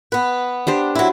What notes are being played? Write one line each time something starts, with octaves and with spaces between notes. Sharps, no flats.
B3 B4
D4 G4 C5
F#3 E4